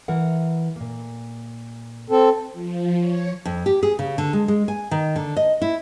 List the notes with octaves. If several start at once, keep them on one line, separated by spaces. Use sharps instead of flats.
E3 A#4 F#5
A#2 A#3
C4 A4
F3
C#5
F2
G4
G#4
C#3
D3
G#3
G#3
G#5
D#3
D3
D#5
E4